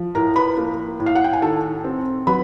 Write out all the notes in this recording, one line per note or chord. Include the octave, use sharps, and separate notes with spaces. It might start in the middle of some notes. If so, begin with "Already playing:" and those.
Already playing: F3
A2 A#4 A#5
B4 B5
A#3
A2
F5
F#5
G5
G#5
D#3 A4 A5
C4
F#3 B4 B5